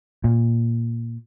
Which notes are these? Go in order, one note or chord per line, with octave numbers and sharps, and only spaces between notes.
A#2